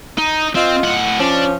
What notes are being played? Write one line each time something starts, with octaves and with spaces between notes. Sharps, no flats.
D#4
C4 F4 D#5
A2 F#5
F3 C#4 D4